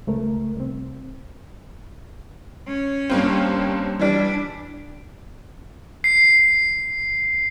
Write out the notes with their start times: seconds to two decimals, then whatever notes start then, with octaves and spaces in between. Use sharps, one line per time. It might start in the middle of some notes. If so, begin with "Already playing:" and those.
0.07 C#2 A3 A#4
0.57 C2 C4
2.67 C#4
3.10 G2 A#3 C4
3.99 E3 G3 D4
6.04 C7